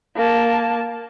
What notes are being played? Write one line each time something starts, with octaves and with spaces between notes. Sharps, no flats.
A#3 A5